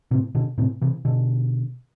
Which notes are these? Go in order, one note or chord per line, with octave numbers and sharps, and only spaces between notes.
A2 C3
B2 D3
A2 C3
C3 E3
B2 D3